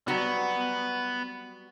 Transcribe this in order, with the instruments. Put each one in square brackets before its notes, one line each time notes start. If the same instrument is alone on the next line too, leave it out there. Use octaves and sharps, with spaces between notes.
[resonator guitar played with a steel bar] F#3 G3 F#4 [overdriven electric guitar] B3